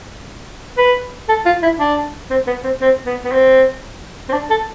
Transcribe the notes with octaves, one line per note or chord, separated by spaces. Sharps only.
B4
A4
F4
E4
D4
C4
B3
C4
C4
B3
B3
C4
C4
D4
A4